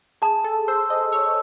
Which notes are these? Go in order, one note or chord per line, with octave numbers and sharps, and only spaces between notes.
G#4 A5
A4
C5 E6
D#5
C#5 E6